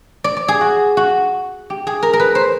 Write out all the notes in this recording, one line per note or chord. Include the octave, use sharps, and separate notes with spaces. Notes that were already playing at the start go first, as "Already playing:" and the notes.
D5
D5
G#4
F#4
F#4
G4
G#4
A#4
A#4
B4
C5